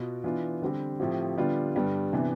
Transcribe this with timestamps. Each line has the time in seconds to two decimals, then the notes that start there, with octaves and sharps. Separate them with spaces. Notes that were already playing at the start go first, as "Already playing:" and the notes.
Already playing: B2 B3 F4
0.24 E3 B3 D4 F4
0.62 D3 G3 C4 G4
1.00 A2 F3 C4 G4
1.37 D3 G3 B3 D4 F4
1.75 G2 D3 G3 B3 D4
2.13 C3 E3 B3 D4